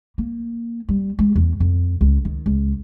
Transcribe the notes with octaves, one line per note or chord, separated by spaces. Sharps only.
A#3
G3
G#3
E2
F2
C#2
D#3
C#2